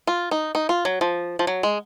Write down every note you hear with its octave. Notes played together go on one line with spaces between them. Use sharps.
F4
D#4
D#4
F4
F#3
F3
F3
F#3
G#3